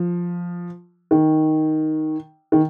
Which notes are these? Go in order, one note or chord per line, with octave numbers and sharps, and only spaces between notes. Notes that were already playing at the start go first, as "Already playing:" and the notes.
Already playing: F3
D#3
D#3